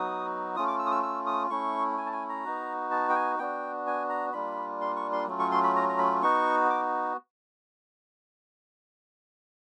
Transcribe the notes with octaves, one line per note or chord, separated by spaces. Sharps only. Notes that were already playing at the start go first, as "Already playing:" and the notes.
Already playing: F#3 B3 D#4 F#4 D#6
A3 C#4 F4 D#6
D6
E6
D#6
E6
E6
D#6
A3 C#4 E4 C#6
G#5
A5
G#5
A#5
B3 D#4 F#4
A5
G5
G#5
B3 D4 F#4 G5
G#5
A#5
G3 A#3 D4 F4 B5
C6
C#6
C6
F#3 A3 C#4 F4
C#6
C6
B5
A#5
A#5
B5
B3 D#4 F#4 C#6
D6